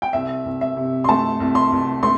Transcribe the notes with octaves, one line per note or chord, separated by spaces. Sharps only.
G5
C2 E5
C2
E5
C3
C6
A3 A5
C2
C6
C2
A3 C6